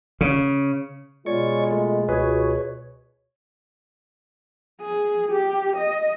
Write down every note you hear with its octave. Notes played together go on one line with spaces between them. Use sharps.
C#3
B2 G#3 B3 F4 C#5 D5 C#6
A3
C#2 B2 G#4 B4 C#5
G#4
G4
D#5